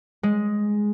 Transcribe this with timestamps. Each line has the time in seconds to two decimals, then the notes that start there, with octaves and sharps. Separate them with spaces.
0.23 G#3